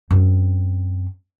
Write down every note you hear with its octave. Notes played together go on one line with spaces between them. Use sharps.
F#2 C4